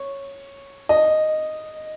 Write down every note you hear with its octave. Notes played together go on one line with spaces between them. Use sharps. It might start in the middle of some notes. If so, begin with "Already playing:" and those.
Already playing: C#5
D#5